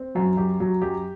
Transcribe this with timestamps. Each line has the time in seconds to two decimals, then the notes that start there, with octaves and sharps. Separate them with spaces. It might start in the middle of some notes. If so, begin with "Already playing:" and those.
Already playing: C4
0.15 F#2 F#3
0.37 F#2 G4
0.60 F#2 F#3
0.82 F#2 G4